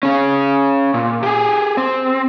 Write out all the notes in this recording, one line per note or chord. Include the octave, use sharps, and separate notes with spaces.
C#4 G#4
A#2
G4 G#4
C4